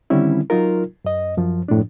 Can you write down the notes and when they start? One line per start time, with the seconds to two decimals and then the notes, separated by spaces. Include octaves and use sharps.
0.10 D3 D#3 G3 C4 C#4 E4
0.50 F#3 D#4 F4 A#4
1.05 F#2 D#5
1.37 F#2 F3
1.68 F#2 A2 F3 D4